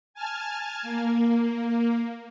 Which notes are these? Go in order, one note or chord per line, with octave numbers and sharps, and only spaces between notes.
G#5 A5 F6 G#6
A#3